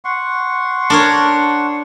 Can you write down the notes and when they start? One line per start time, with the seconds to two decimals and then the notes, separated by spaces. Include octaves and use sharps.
0.05 F#5 C6 C#6
0.90 D4 A#4 C#5